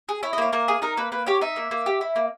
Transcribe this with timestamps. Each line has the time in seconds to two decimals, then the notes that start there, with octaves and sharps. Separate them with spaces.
0.09 G#4
0.23 E4 C#5
0.33 D#5
0.38 A#3 C#5
0.52 A#3 A#4
0.68 G#4
0.82 D#4 A#4
0.97 A#3 B4
1.12 A#3 B4
1.26 G4 C#5
1.41 D#4 E5
1.56 A#3
1.71 A#3
1.86 G4
2.01 E4
2.16 A#3